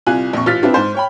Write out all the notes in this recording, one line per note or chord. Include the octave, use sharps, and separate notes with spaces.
C2 F4 G#5 F#6
A#1 F2 C#6
A1 F4 F6 A6 B6
C4 D4 E4 F4 B4
G#2 C5
C#5 G5 B5